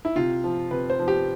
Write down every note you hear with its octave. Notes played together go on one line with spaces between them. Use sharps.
E4
C3 F4
F3
C3 B4
C5
F3
G4